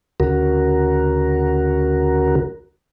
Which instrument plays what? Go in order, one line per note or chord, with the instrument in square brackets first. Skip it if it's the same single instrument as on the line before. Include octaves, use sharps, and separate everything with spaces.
[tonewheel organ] D2 C#3 F#4 A#4